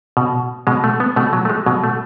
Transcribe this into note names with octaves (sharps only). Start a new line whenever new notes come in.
B2
B2 G#3
A3
B3
B2 A3
F#3
A3
G#3
B2 F#3
A3